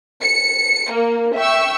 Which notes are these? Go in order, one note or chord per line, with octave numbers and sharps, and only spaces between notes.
C#7
A#3
E5 G5 C#6 E6